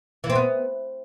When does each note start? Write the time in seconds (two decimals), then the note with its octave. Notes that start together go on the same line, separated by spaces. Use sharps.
0.24 E3
0.30 C4
0.35 B3